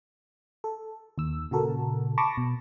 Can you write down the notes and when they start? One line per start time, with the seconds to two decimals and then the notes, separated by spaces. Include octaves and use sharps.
0.64 A4
1.18 D#2 E6
1.51 A#2 C#3 F#4 A4 A#4
2.18 A5 B5 C#6 D6 A6 A#6
2.37 B2